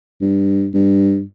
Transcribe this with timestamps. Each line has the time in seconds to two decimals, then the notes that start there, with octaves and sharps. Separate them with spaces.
0.21 G2
0.74 G2